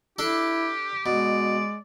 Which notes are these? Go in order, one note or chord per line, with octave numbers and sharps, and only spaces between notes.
D4 E4 G4 A4
B2 G#3 D5